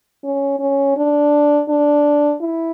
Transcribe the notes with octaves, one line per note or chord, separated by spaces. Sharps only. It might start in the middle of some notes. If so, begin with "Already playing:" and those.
C#4
C#4
D4
D4
E4